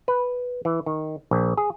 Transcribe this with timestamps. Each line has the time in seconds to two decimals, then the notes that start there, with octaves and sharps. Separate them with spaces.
0.08 B4
0.65 E3
0.86 D#3
1.31 A#1
1.57 G#4